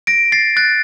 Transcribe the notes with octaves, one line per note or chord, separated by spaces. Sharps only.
A#6 D7
A6 C7
F#6 A6